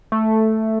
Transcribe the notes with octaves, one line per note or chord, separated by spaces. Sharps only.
A3